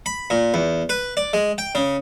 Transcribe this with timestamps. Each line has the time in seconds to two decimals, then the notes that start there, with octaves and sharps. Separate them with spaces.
0.06 B5
0.30 A#2
0.54 E2
0.89 B4
1.17 D5
1.33 G#3
1.58 G5
1.75 C#3